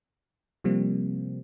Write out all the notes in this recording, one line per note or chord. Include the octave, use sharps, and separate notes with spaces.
C3 F3 G3 A#3 C4